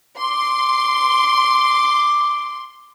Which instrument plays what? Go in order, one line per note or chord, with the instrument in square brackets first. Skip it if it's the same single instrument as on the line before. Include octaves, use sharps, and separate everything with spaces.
[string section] C6 [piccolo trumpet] D6